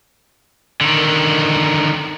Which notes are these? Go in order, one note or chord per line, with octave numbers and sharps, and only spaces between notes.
D3 D#3